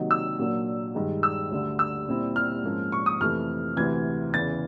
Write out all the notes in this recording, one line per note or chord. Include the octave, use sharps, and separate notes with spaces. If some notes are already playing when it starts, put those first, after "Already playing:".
Already playing: C3 D#3 F#3 A#3 D#4
E6
A#2 F#3 A#3 D4
G2 D#3 G#3
E6
D2 D3 G3
E6
A#2 G3 C4 E4
F6
G#2 F3 A#3 C#4
C#6
D#6
F2 C3 E3 A3 F6
D2 C3 E3 G#6
E2 C#3 E3 A6